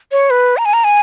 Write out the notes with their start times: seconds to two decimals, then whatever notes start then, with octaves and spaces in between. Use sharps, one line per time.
0.12 C#5
0.30 B4
0.57 A#5
0.65 G#5
0.73 A#5
0.84 G#5